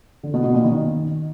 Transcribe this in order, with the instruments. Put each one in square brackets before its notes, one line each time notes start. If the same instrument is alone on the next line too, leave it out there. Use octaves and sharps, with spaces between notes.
[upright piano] D3
B2
B2
A#2
D#3